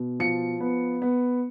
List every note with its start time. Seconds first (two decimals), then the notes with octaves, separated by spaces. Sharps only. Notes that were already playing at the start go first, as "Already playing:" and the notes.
Already playing: B2
0.20 F3 C#7
0.60 B3
1.02 B3